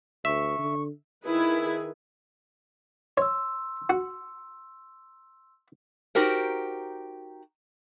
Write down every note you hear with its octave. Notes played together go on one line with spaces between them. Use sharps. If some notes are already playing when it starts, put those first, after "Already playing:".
D2 E5 C#6
D3
D#3 E4 G#4 B4
C#5 C6 E6
F#4
D#4 F#4 G4 A#4 C5